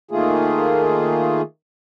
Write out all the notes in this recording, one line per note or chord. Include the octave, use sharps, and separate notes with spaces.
D#3 A3 A#3 F4 G#4